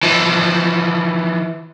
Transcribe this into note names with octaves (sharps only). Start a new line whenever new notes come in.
E3 F3